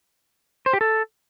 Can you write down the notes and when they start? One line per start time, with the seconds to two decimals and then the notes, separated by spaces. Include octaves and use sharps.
0.66 C5
0.73 G4
0.81 A4